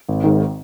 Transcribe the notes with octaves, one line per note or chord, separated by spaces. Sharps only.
G#1
G#2 D#3